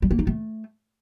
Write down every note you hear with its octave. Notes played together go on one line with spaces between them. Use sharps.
G3
A#3
D#4
A3